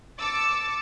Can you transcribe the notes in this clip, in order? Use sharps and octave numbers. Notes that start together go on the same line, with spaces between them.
A5 D6 E6 A6 C#7